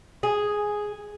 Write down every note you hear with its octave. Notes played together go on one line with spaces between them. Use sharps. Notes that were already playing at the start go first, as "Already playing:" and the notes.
G#4